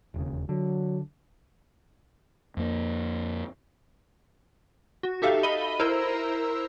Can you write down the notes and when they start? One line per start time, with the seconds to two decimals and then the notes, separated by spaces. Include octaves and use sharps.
0.14 E1 D#2 C#3
0.49 D3 F#3
2.57 F2 A#3
5.03 F#4
5.22 D#4 G4 A4 E5 F5
5.43 D#5 B5 D#7 G7
5.79 E4 A#4 C5 A#5 E6